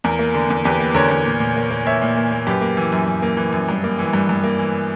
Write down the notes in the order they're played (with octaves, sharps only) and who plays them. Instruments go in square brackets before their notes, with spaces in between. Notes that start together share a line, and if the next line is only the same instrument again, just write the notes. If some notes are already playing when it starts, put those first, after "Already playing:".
[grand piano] E2 A#4
A#3
D3
E2
E2 G4 B4
A#3
D3 A#4 C#5
E2
A#2
A#2
A#3
A#3
A#2 C#5 E5
A#2
A#3
A#3
F#2 G4 B4
A#3
E3
F#2
F#2
A#3
E3
F#2
G2
A#3
E3
G2
G2
A#3
E3